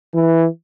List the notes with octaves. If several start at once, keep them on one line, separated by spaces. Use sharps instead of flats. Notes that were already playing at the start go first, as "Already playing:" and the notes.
E3